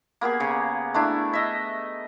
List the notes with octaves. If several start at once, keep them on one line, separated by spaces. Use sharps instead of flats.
A#3 B3 G4 G#4
C#3
A3 D4 E4
D#5 E5